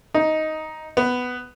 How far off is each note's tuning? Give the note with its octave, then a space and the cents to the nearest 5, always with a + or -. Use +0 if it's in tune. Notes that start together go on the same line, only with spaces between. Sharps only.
D#4 +10
B3 +10